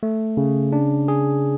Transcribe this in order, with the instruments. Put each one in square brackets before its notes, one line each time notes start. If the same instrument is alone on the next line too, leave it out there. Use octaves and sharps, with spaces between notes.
[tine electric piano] A3
C#3
D4
G#4